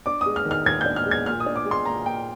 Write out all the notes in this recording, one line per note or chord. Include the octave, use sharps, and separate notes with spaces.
D4 D6
D#6
G#3
F6
D#3
F6
D#2 G#6
D4 G6
F6
G#3
G#6
A#2 F6
D#6
D4
D6
G#3
C6
A#2 A#5
A#2 G5